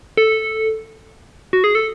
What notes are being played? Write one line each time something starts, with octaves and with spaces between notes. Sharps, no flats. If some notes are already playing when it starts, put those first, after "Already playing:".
A4
F#4
G#4
A4